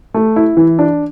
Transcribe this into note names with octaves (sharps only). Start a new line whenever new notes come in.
A3
E4
E3
D4